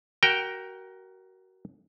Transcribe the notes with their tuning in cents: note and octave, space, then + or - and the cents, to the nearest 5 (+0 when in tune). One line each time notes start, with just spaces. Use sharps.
F#4 +25 A#4 +10 G5 +0